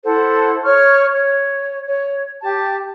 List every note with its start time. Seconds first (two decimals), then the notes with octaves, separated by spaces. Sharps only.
0.04 E4 A4 C5 F#5
0.64 C#5 C#6 F6
1.12 C#5
1.88 C#5
2.42 G4 A5